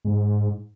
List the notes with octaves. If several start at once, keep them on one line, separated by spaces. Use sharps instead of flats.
G#2